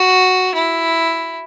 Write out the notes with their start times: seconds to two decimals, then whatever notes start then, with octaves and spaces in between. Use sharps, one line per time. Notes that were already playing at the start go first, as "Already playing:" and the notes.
Already playing: F#4
0.54 E4